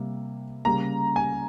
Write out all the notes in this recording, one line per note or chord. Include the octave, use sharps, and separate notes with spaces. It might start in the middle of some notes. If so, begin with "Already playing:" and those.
Already playing: C3 G3 A#3
C#3 G3 A#3 A#5
G#5